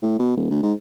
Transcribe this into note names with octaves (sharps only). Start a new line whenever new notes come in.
A2
B2
D#1
D2
G#2